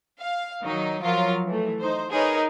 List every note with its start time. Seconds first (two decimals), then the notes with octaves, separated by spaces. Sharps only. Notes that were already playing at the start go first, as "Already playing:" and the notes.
0.20 F5
0.63 D#3 F#3 D#4
1.02 F3 F#3 F4 A#4 C#5 F5
1.47 E3 A3
1.80 D#4 C5
2.11 D#4 G#4 A#4 B4 C#5